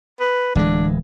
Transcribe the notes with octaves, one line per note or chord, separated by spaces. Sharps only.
B4
D1 E3 G#3 D4